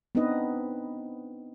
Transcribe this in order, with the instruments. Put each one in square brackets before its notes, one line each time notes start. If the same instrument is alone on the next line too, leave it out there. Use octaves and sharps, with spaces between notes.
[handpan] B3 C4 D4 D#4 B4 D#5